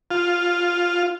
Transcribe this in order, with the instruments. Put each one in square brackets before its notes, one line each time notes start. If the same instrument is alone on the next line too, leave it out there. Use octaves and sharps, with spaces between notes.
[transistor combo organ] F4